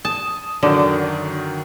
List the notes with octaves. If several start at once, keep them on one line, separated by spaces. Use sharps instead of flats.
A5 D#6
F#2 D3 D#3 F#3